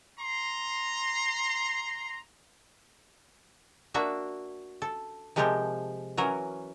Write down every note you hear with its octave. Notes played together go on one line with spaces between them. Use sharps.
A#5 C6
A#3 D4 F#4 E5
A4
C3 F3 G#3 G4 A4 A#4
E3 F#3 C#4 A#4